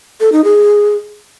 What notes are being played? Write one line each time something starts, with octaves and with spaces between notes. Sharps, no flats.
A4
D#4
G#4